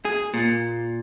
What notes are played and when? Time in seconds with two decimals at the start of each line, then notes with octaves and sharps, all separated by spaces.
0.05 G#4
0.34 A#2